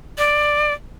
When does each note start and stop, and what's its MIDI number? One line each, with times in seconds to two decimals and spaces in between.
0.18 0.73 74